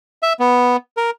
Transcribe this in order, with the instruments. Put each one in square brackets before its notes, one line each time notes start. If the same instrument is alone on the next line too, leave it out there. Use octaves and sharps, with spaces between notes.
[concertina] E5
B3
A#4